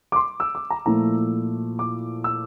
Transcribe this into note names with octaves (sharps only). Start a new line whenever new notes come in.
D6
C6
E6
D6
A#5
A#2 F3 A3 E4 A#5
D6
E6